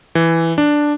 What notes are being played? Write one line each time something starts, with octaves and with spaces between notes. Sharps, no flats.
E3
D4